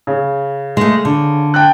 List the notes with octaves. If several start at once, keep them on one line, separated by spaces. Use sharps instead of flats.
C#3
G#3 A3
D3
G5 A5 F#6